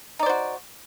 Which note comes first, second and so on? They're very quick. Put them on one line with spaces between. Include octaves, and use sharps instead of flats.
D#4 D5 C5 F#4